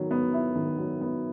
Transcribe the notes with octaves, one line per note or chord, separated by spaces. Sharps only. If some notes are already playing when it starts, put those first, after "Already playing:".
Already playing: D#3 F#3 B3
B3
E4
D#3
F#3
B3